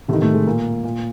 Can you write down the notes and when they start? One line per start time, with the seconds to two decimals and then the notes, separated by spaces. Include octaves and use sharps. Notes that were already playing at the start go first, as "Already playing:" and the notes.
0.08 A2 C3 A3
0.13 D#3
0.21 A2 A3
0.34 G#3
0.47 A#2 A#3
0.84 A#2